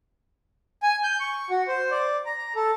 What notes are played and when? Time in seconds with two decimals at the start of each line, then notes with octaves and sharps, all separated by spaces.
0.83 G#5
1.03 G6
1.20 C#6
1.50 F#4
1.68 C5
1.91 D5
2.26 A#5
2.56 A4